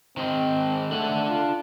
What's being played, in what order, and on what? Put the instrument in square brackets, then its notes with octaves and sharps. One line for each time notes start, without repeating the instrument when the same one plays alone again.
[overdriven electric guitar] D#3 G#3 [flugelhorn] C4
[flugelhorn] A3 [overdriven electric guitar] D4 F#5
[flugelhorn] F4